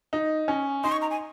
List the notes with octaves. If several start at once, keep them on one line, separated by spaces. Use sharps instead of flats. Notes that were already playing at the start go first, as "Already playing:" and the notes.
D#4
C#4
D#4 C6
C#6
A#5
G#5